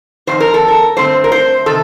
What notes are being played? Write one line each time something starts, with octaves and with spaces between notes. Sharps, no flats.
F2 C3 D#3 C5
A#4
A4
A#4
G2 D3 A3 C4 C5
A#4
C5
C3 D#3 A4